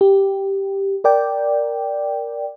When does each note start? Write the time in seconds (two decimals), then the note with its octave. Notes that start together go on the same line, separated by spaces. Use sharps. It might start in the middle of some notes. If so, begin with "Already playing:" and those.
0.01 G4
1.04 A#4 D5 G5